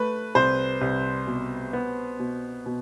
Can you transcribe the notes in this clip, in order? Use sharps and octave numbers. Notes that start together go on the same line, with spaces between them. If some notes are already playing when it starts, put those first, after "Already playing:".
Already playing: A3 B4
C2 C5
C2
B2
B3
B2
B2